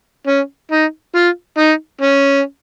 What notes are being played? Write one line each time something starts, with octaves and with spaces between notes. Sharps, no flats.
C#4
D#4
F4
D#4
C#4